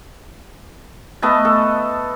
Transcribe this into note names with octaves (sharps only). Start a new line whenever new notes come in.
A3 B3 D#5 A5
A4